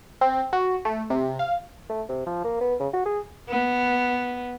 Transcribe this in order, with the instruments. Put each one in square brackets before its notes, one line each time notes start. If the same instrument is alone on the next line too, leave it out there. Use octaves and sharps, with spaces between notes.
[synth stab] C4
F#4
A3
C3
F5
[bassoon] A3
C3
F3
A#3
B3
C#3
F#4
G#4
[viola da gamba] B3